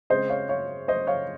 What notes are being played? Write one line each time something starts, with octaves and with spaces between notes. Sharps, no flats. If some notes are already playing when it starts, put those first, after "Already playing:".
C#3 G#3 C4 C5 D#5
C#5 F5
C#5 F5
C5 D#5
C#5 F5